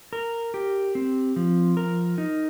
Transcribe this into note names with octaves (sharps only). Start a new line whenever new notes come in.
A#4
G4
C4
F3
A#4
D#4